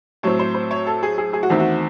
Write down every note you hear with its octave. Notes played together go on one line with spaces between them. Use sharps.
A2 F#3 C4 C#5
C5
C5
C#5
A4
G#4
G#4
G#4
F#4
E2 D#3 A3 C4
F#4